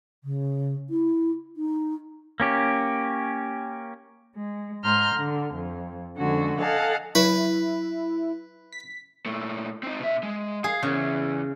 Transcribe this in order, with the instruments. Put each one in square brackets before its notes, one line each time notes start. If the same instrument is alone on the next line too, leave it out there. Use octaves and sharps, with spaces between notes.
[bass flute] C#3
E4
D#4
[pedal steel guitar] A#3 C#4 G4
[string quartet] G#3
G#2 A#5 C6 F6 G6
D3
F2
F2 D3 G#3 C#4 F#4
A4 D#5 F5 F#5 G#5 A5
[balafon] F#3 [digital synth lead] E4 [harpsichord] B4
[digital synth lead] B6
[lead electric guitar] A#2 A3
C4 D#4
B2 E5
G#3
[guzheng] G#4 [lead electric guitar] F5
[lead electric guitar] E2 [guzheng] C#3